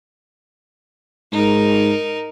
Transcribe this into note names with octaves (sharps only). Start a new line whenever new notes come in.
G#2 D#4 A#4